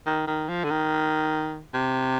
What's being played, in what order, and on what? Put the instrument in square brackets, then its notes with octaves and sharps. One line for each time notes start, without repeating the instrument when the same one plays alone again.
[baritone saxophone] D#3
D#3
F3
D3
D#3
C3